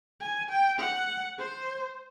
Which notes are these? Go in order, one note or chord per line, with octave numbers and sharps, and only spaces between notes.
G#5
G5
F#5
C5